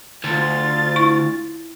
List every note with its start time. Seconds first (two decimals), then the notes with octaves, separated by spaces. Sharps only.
0.24 D2 F4 A6
0.96 E4 C#6